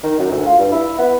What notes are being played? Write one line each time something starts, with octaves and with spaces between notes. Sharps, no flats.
D#3
F#2
D2
F4
G2
E4
B3